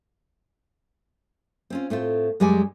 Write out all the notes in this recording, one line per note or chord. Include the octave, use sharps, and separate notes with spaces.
C4 C#4 F4
A2 A3 C4 F4
F#2 G3 G#3 D5 G#5